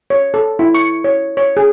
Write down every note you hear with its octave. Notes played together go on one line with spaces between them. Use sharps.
C#5
A4
E4
C#6
C#5
C#5
G#4